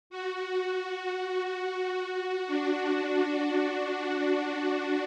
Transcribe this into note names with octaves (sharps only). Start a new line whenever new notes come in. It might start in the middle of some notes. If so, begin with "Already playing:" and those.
F#4
F#4
D4